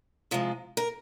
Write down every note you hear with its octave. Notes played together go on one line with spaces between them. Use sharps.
C3 F3 G#3
A#4